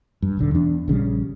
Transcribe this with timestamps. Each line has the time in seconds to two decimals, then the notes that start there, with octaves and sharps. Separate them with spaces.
0.22 G2
0.37 E1 B1 D3
0.51 E2 D4
0.88 A#1 C#3 E3 G3